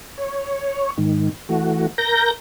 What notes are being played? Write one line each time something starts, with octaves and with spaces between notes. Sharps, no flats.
C#5
G#2 D#3
E3 A3 F#4
A#4 G6 A#6